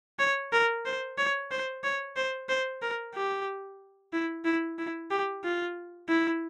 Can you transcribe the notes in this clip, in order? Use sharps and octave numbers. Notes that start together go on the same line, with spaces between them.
C#5
A#4
C5
C#5
C5
C#5
C5
C5
A#4
G4
E4
E4
E4
G4
F4
E4